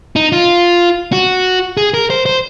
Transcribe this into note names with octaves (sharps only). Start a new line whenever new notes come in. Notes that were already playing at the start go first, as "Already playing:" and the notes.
D#4
F4
F#4
G#4
A#4
C5
C5